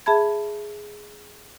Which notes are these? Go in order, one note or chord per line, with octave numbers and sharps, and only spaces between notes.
G#4 E5 A5 B5 G#6